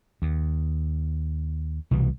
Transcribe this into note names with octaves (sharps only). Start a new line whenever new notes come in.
D#2
C2 B2 E3